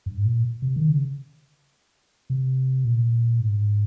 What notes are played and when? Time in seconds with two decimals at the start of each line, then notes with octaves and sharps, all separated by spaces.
0.06 G2
0.16 G#2
0.25 A#2
0.62 C3
0.76 D#3
0.90 C#3
2.30 C3
2.85 A#2
3.41 G#2